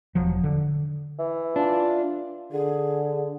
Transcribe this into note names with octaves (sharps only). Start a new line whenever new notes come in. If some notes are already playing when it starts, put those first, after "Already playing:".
E1 F3 F#3
D3
E3
D4 F4
D3 G#4